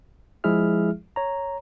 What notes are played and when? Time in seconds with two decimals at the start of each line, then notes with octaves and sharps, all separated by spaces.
0.44 F3 G#3 E4 G#4 E5 F6
1.16 C#5 A#5